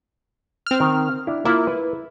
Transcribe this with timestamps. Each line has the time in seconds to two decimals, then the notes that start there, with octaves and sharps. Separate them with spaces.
0.66 C4 F6
0.80 D#3
1.27 D4 E4
1.45 A#3 E4 F4
1.67 B4